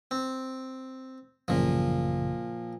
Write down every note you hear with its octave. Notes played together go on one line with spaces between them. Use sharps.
C4
A1 F#2 A#2 C#3 F3